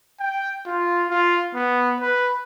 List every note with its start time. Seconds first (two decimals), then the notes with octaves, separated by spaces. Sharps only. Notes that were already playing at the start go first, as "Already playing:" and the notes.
0.20 G5
0.66 F4
1.10 F4
1.54 B3
2.00 B4